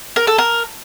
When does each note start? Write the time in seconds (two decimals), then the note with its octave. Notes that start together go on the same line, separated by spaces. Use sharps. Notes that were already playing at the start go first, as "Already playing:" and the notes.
0.16 A#4
0.27 A4
0.38 A#4